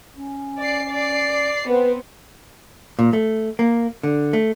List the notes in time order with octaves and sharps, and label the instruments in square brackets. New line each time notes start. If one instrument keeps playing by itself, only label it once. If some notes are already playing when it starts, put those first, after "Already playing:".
[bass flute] C#4
[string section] D5 C7
D5 C7
[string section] B3 C4 [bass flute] B4
[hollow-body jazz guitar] A#2
A3
A#3
D3
A3